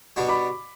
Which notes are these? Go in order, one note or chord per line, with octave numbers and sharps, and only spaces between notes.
B2 G3 D4 F#4
B5 D6